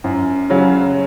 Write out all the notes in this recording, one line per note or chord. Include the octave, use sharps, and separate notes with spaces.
F#2
C#3 F#3